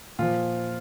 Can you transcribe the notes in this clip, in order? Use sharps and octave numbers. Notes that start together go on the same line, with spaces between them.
A#2 F3 F4